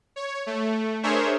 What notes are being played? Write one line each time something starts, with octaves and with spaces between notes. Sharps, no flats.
C#5
A3
D4 G#4 A#4 C5 C#5 E5